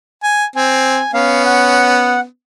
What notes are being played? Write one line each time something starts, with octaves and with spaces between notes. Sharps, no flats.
G#5
C4 G#5
B3 C#4 F5
F#5